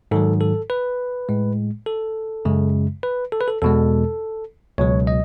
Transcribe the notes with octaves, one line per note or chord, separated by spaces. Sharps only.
G#2 D#3 F#3 A4
A4
B4
A2 G#3
A4
F#2 C#3 G#3
B4
A4
B4
A4
E2 B2 G#3 A4
C#2 B2 F#3 C#5
D#5